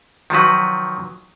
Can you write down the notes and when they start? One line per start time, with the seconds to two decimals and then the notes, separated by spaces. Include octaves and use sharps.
0.30 D#3 F3 F#3 B4